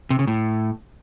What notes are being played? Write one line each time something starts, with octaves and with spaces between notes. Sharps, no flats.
C3
C#3
A2